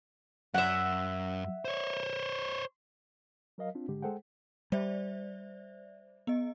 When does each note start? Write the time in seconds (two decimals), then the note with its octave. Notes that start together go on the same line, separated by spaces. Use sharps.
0.54 F#2 E5 F#5
1.65 C5 C#5
3.58 F#3 A#4 D#5 F5
3.75 C4 D4 F4
3.88 G#2 D3 G#3 G4
4.02 G#3 G#4 A4 C5 F#5 G5
4.72 G3 C5 D5 E5
6.27 B3 D#5